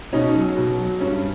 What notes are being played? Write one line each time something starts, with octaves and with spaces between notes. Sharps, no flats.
B2 C#4 D#4
F#3
B2
F#3
G2 C#4